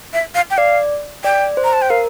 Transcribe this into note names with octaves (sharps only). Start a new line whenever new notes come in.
E5
F5
G5
D5 F5
D5 G5
C5
A#5
A5
G5
A#4 F5